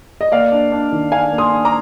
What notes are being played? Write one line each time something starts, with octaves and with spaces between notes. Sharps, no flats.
D#5
A#3 D5 F5
D4
D4
D#3
D4 F5 G#5
A#3
C6 D#6
D4
A#5 D6